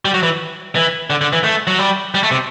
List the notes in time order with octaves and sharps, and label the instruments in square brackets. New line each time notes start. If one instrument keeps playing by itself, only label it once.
[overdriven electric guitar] G3
F#3
E3
E3
D3
D3
E3
A3
F#3
G3
G3
A3
C3